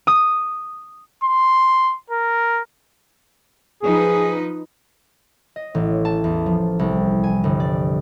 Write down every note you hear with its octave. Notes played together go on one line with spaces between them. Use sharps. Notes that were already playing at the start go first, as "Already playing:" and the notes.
D#6
C6
A#4
F3 D#4 G#4 B4
D#5
A1
A5
E2
F3
C2
G#5
G1
D5